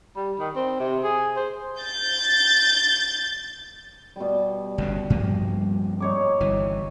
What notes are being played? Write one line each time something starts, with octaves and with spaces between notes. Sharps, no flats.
G3
D#3
C4
C3
G#4
C5
G6 A6
B2 G3
G1 G2 C#3
G2 F3 A#3
D#4 C#5 D6
G1 E3